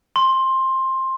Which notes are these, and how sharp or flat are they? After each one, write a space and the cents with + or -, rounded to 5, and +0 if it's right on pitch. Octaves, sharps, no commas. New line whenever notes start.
C6 +15